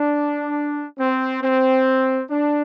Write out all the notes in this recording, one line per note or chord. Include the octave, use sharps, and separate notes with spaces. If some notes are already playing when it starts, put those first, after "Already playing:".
Already playing: D4
C4
C4
D4